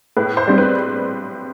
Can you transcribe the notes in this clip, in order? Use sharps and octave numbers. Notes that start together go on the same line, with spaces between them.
A2 B4
C5
G3 C4
B4